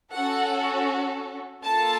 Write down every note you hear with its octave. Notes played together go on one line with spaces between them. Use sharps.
C#4 F#4 A4 F#5
A#3 F4 A4 A5